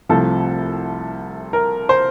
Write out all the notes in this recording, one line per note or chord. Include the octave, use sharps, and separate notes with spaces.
C2 C3 F3 A3 A4
A#4
C5